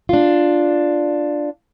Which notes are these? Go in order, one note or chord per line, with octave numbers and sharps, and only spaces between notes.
D4 F4